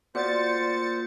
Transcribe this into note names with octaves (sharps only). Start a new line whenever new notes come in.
A#2 F#4 C5 D5 A6 C#7